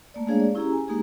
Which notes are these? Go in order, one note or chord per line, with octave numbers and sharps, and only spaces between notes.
A3 A#3 D5
G#3 A#3 D4 G#4 C#5 F5
D5
C#4 E4 G4 G#4 A#5
G#5
G#3 A#3 D#4 G4 G#4